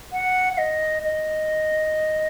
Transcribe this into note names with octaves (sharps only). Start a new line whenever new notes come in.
F#5
F#5
D#5
D#5